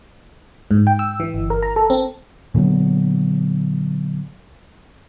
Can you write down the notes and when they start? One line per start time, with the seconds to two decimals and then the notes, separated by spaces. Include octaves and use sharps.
0.71 G#2
0.87 G5
0.99 E6
1.20 E3
1.34 G1
1.50 A#4
1.62 A#5
1.76 A4
1.90 C4
2.54 A#2 D3 F#3 B3